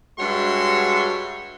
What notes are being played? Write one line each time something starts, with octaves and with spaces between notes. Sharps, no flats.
G2 G#3 F#4 C#5 E5 C6